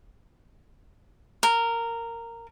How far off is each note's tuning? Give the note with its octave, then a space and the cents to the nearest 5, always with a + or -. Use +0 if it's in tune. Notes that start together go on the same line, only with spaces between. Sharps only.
A#4 -10